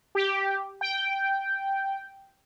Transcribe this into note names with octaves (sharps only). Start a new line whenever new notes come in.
G4
G5